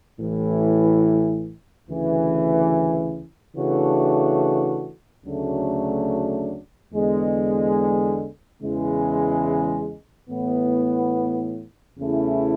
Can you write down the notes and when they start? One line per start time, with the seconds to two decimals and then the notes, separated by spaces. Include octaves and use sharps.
0.20 A1 A2 E3
1.89 D2 C#3 E3
3.56 C#3 E3 A3 D4 F#4
5.26 D2 C#3 F#3 A3 D4
6.93 E2 D3 G#3 B3
8.62 E2 C#3 E3 G#3
10.30 A2 E3 B3
11.99 E2 C#3 E3 A3 E4